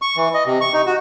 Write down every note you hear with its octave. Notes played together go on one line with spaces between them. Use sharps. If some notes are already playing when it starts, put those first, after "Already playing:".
C#6
E3
D#5
C3
C#6
D#4
F#4